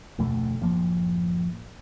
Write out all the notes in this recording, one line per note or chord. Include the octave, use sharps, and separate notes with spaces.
F1 D2 B2 A3
F#1 A2 F3 A#3